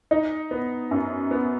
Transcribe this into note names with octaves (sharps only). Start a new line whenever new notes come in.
D#4
B3
F#2
B3